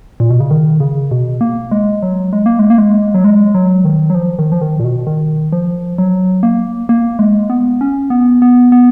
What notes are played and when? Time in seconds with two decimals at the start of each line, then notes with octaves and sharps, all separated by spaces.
0.20 A#2
0.30 B2
0.40 C#3
0.51 D#3
0.80 C#3
1.11 B2
1.41 A#3
1.71 G#3
2.03 F#3
2.33 G#3
2.46 A#3
2.59 G#3
2.70 A#3
2.78 G#3
3.14 F#3
3.24 G#3
3.55 F#3
3.84 D#3
4.10 F#3
4.15 F3
4.39 D#3
4.52 F3
4.61 D#3
4.80 A#2
4.84 B2
5.07 D#3
5.52 F3
5.98 F#3
6.43 A#3
6.89 A#3
7.19 G#3
7.50 B3
7.81 C#4
8.10 B3
8.42 B3
8.72 B3